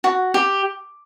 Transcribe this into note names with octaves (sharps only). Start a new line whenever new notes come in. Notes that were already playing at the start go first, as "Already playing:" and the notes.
F#4
G4